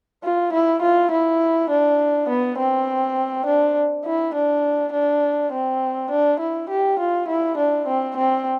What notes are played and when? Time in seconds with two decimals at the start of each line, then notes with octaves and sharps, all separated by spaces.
0.23 F4
0.53 E4
0.82 F4
1.11 E4
1.70 D4
2.29 B3
2.58 C4
3.46 D4
4.05 E4
4.34 D4
4.93 D4
5.52 C4
6.11 D4
6.40 E4
6.70 G4
7.00 F4
7.28 E4
7.58 D4
7.87 C4
8.16 C4